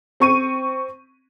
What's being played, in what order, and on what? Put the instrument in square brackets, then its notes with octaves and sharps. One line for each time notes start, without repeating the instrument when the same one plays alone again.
[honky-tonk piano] C4 C#6 D#7